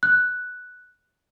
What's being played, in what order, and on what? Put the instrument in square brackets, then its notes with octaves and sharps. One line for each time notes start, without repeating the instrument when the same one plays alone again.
[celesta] F#6